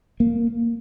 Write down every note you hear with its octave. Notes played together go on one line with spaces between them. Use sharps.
A#3